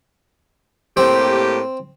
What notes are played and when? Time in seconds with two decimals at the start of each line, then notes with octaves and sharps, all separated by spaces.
0.97 A2 A#3 C4 G4